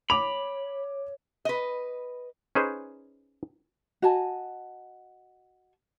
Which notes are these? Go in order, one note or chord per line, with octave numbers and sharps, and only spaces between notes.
C#5 B5 D6 F7
B4 D#5
C#4 D#4 G#4 B4 C5
F#4 D#5 G#5 A5